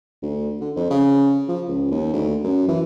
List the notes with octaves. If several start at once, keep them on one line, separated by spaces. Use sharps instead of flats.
D2
D3
F2
C#3
F3
C#2
D#2
D2
F#2
E3